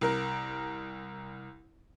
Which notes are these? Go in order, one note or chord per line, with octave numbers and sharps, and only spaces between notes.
C2 A#4